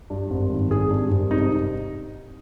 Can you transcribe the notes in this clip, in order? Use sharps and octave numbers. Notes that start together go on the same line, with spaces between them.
G2
G#1
D#3
G#1 G#4
G2
G#1
C3 D#4